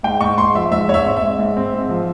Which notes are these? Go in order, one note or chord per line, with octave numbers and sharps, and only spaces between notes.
G#2 G5
G#2 C#6
G#2 C6
F3 E5
G#2 E5
G#2 C#5
E5
C4
E5
G#2
G#2
C4
G#2
F3